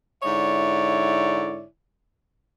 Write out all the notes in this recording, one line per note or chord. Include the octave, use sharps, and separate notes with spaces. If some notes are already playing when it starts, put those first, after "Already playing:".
G#2 D3 E4 C#5 D5 E5